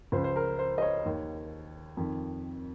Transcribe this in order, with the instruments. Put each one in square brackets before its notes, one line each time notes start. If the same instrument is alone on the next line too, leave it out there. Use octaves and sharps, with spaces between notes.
[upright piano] C#2 C#3 F3 C5
C5
A#4
C5
D#5
C#5
D#2 D#3
F2 D#3